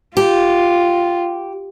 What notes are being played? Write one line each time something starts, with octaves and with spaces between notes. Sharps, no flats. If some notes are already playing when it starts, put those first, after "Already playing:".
F4 G4